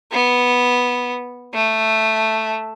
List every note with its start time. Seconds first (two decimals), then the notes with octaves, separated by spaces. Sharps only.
0.12 B3
1.54 A3